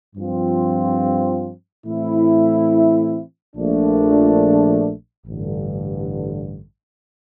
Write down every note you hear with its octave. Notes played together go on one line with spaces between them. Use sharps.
G2 F3 C4 F4
A2 E3 A3 C4 E4
A#1 A#2 A3 D4
A1 G2 D3